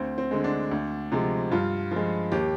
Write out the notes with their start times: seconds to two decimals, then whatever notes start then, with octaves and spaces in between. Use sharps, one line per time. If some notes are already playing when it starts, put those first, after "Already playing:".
Already playing: D2 C4
0.18 C4
0.31 D3 G#3
0.44 D4
0.71 D2
1.12 C3 F3 G#3
1.51 G2 F4
1.91 F3 G#3
2.32 D#2 G4